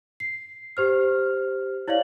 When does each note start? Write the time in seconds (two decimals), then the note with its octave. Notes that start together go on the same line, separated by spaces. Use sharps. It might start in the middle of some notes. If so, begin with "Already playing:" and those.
0.20 C7
0.77 G4 C5 F6
1.88 E4 C#5 D5 F5 F#7